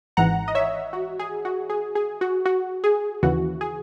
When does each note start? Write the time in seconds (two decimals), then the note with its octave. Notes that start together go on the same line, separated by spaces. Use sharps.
0.17 G#1 G#2 E3 F#5 A#5
0.48 D#5
0.55 C#5 E5
0.93 F#4
1.19 G#4
1.45 F#4
1.70 G#4
1.95 G#4
2.21 F#4
2.45 F#4
2.84 G#4
3.23 D#2 C#3 E3 F#4
3.61 G#4